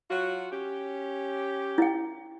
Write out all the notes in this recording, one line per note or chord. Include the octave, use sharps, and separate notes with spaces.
F#3 F4 F#4
C#4 G4
E4 G5